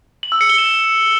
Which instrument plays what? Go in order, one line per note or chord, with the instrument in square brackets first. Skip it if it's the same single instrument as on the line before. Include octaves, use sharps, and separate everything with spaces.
[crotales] F#7
E6
C#7
G7
E7